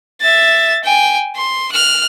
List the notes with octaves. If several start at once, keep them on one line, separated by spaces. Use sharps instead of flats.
E5 A6
G5 G#5
C6
F6 F#6